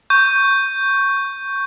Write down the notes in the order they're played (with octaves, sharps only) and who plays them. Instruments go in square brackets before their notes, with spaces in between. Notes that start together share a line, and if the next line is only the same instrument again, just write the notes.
[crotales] C#6 G6